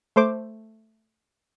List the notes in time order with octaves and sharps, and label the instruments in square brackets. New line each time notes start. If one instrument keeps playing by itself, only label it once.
[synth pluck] A3 C5 D6